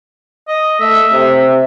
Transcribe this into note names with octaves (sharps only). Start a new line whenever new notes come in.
D#5
A3 E5
C3